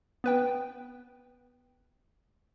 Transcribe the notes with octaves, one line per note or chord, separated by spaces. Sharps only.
B3 B4 G5